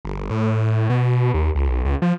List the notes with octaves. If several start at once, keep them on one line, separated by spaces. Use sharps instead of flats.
G1
A2
B2
D#2
C#2
B1
C#2
F3